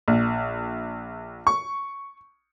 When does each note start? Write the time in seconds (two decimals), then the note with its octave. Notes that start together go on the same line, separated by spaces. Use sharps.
0.08 A#1
1.47 C#6